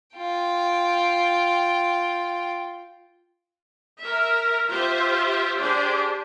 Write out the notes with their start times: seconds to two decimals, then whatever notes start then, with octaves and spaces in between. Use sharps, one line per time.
0.16 F4 G5
4.01 A#4 E5
4.68 F4 G4 C5 E5
5.57 D4 G4 G#4 C5